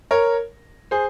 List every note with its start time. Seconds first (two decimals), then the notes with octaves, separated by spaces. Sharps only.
0.11 A#4 C#5
0.91 G#4 C5